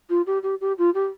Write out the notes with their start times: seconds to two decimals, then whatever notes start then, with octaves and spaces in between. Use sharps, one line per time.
0.09 F4
0.26 G4
0.43 G4
0.60 G4
0.78 F4
0.94 G4